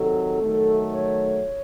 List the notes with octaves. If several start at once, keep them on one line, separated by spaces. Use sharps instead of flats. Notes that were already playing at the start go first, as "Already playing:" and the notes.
Already playing: C3 D#3 F#3 A4
D#3 F#3 A3
C#5